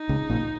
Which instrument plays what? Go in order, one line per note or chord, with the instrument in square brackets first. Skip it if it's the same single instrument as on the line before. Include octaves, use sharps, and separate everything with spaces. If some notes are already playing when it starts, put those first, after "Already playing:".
Already playing: [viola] D#4
[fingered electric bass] C#2 C#3
A#1 A#2